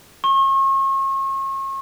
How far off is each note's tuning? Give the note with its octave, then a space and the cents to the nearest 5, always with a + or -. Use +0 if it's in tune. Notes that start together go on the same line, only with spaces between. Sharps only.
C#6 -40